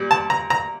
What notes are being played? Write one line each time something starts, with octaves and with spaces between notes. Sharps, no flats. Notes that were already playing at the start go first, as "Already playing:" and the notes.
Already playing: A#2 G3
A5
A#5
A#5